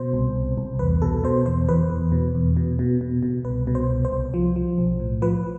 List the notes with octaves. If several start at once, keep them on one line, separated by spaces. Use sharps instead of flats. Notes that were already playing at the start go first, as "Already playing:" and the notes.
Already playing: B2 C5
C2
C2
C2
E2 B4
B2 A4
B2 C5
E2 C5
E2 B4
E2
B2
E2
B2
B2
B2
B2
C2 B4
B2
C5
C2
C5
C2
F3
F3
B1
A2
F3 B4